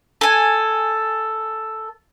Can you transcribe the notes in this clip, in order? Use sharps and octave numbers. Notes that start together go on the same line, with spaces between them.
A4 G#5